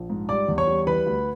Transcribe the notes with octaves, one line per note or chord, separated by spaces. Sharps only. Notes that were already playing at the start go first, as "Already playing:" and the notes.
Already playing: A#1
G#2
G3 D5 D6
E2
C#5 C#6
G3
E3 B4 B5
D2